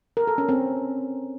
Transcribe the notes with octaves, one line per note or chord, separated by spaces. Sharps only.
A#4
A4
C#4
C4